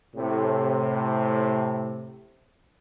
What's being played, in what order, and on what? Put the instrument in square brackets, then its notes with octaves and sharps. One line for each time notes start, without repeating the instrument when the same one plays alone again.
[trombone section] A2 C3